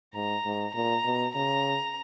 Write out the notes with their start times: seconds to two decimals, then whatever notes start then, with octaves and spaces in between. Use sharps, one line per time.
0.15 G#2 A#5
0.45 G#2
0.75 A#2 A#5
1.05 B2
1.35 C#3 A#5